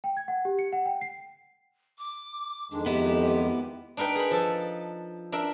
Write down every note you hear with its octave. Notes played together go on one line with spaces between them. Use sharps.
G5
G#6
F#5
G4
C#7
F#5
G5
C7
D6
F2 D#3 G#3 D4
B3 E4 G4
D4 D#4 A#4 B4 G5
G#4 B5
F3 A4
D4 A#4 E5